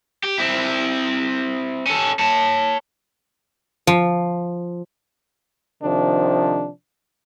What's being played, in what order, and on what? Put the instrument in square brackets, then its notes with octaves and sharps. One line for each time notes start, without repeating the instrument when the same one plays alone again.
[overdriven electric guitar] G4
C4 E4
C#4 A4
C#5 A5
[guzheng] F3
[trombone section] C3 D#3 F3 D4